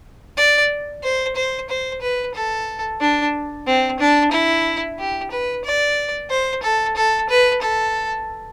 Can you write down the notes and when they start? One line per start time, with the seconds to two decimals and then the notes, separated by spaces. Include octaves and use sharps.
0.37 D5
1.03 C5
1.36 C5
1.69 C5
2.01 B4
2.35 A4
3.01 D4
3.67 C4
4.00 D4
4.32 E4
4.99 G4
5.31 B4
5.65 D5
6.30 C5
6.63 A4
6.96 A4
7.29 B4
7.62 A4